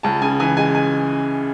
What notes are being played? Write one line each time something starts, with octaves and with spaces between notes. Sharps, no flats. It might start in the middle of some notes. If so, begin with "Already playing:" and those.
C#2 A5
C#3 G#5
E3 G#5
G#3 G#5
G#5